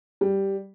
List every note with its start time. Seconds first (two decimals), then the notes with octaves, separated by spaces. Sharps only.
0.21 G3